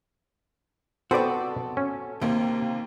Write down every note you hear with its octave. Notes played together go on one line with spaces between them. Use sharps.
B3 C4 F#4 A4 B4 D5
C#4
D#2 C3 A#3